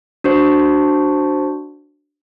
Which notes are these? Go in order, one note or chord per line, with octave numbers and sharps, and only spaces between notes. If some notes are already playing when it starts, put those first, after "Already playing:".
D4 F#4 C5